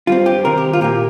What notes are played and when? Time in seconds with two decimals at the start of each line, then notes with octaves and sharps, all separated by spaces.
0.07 G2 G3 C4 F4
0.26 G4
0.45 C3 D#3 C4 A#4
0.58 G4
0.73 F4
0.81 A#2 A#3 G4